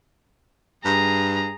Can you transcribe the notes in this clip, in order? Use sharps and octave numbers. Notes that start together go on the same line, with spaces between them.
G2 G#4 A#5